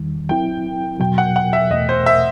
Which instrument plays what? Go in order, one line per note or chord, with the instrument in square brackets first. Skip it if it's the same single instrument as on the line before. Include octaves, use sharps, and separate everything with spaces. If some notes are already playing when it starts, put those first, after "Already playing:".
Already playing: [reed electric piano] E2 D#3 G3
[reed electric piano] F#3 C4 E4 [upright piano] G5
[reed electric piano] E2 B2 F#3 [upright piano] G5
[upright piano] F#5
F#5
E5
[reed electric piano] E2 B2 A3 [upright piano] D#5
[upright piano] C5
E5